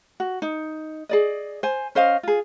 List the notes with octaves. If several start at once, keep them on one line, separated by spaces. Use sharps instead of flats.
F#4
D#4
G#4 D5 D#5
C5 G#5
C#4 C5 D#5 F5
F4 G#4